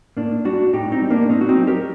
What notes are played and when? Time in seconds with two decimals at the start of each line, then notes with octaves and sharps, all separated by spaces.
0.17 A2 A#3 D4
0.45 G3 D4 F#4
0.73 A2 D#4 G4
0.92 C4 D#4
1.02 G3
1.10 A#3 D4
1.29 A2 C4 D#4
1.41 F#4
1.49 C4 D#4
1.58 F#3
1.67 G4 A#4